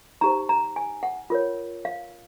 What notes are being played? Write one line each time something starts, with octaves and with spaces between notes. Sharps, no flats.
D#4 G4 C5 A#5
A#5
G#5
F#5
F4 A#4 C#5
F5